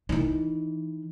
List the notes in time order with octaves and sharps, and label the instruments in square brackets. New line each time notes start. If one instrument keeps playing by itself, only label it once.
[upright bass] D#3 E3